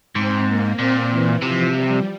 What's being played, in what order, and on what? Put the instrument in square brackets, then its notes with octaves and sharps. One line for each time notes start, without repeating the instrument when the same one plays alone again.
[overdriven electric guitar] G#2 [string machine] C4
[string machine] A#3
[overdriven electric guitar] A#2 [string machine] C4
[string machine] E3
[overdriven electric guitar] C3 [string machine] F3
[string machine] G3